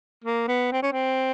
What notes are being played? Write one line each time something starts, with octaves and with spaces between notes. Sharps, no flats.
A#3
B3
C4
C#4
C4